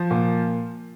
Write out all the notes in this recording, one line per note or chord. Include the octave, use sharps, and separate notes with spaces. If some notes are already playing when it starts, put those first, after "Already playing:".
Already playing: F3
A#2